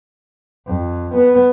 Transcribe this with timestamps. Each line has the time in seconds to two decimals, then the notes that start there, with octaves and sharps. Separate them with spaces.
0.67 F2
1.15 B3